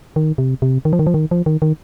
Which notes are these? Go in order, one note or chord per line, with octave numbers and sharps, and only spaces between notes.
D#3
C3
C3
D#3
F3
D#3
F3
D#3
F3
D#3
D#3